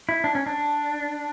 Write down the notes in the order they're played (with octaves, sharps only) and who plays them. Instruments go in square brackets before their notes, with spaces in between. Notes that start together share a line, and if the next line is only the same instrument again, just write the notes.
[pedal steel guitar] E4
D4
C#4
D4